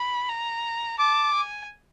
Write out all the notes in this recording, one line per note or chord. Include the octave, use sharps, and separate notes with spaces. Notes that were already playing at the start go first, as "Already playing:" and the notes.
Already playing: B5
A#5
A5 D6
G#5